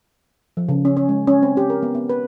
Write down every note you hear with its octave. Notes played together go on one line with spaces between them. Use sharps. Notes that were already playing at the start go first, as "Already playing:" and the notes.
F3
C#3
C#4
C#4
G#3
C#4
C4
G4
A#4
B3
B3
B4